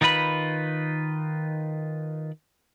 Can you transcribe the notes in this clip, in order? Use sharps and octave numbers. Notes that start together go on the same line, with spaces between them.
D#3 D#4 F4 B4 B5